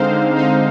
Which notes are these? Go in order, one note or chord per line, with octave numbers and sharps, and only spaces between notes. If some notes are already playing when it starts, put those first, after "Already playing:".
Already playing: D3 G#3 C4 D#4 C5 F5
D3
D#4